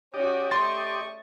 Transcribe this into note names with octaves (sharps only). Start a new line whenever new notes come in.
C#4 F#4 G4 D5 D#5
A3 C6 C#6 A6